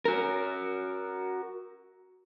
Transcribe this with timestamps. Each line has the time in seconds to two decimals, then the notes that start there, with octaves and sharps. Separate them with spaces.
0.05 F#4 A#4